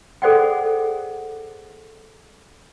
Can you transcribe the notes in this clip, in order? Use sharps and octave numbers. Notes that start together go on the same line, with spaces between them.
G#4 A4 C5 D5 F#5 G5